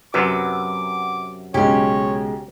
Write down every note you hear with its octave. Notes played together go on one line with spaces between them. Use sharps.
F#2 C3 F#3 B4 D6
B1 C#3 G#3 C#4 G4 C#5